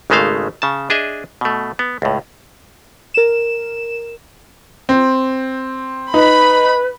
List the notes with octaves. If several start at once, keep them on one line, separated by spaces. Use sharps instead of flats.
G#1 C#3 G#3 A3 C5 F5
C#3 A5
D4 G#4 D#5 E5
B2 A3
B3
C#2 A2
A#4 E7
C4
D#4 B4 B5